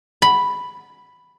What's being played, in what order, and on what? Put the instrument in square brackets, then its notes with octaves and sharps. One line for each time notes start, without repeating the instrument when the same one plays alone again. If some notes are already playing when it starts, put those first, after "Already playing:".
[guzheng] B5